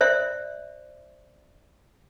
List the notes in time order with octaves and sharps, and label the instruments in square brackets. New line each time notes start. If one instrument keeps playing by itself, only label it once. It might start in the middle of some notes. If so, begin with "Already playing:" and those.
[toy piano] C5 D5 E5